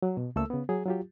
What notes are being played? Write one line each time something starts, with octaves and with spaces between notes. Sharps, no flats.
F#3
B2
C#2 A3 A#3 A4 E6
C#3 B3
F#3 G#4
F#3 F4 G4